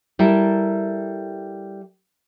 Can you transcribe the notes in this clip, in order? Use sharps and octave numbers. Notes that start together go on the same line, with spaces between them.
G3 E4 A4 A#4